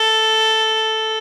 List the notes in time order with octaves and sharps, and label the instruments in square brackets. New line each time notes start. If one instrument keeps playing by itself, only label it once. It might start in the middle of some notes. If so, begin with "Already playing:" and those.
Already playing: [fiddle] A4